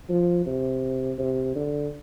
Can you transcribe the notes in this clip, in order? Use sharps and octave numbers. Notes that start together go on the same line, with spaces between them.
F3
C3
C3
D3